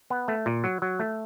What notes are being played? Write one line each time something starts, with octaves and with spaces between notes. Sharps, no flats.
B3
A3
A#2
F#3
F#3
A3